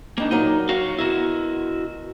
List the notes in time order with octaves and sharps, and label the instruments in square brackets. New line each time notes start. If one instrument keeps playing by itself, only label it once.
[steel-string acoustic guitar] G3 D#4 [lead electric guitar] A#3 D4
[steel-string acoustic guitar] A#2 F#3 A#4 [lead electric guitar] D#4
[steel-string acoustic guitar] F#3 [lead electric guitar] F#4 F5
[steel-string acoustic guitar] B2 A#4 [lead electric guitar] E4 F#4